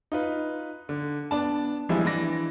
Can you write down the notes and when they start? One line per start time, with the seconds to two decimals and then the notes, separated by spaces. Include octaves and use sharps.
0.12 D#4 F4 B4
0.89 D3
1.31 B3 D4 A5
1.89 E3 F3 G3 G#3 C4 E4
2.05 E3 D4 D5 A#6